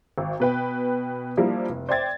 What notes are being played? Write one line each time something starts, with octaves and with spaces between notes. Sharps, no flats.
G#1
B2 B4 G5
F3 G3 A#3 D4 E4
F1
C5 D5 E5 G5 G#6 A6